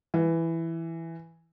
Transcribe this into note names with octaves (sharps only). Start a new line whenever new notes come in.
E3